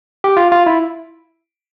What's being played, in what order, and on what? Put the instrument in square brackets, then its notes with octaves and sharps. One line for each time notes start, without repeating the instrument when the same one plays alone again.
[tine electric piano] G4
F4
F4
E4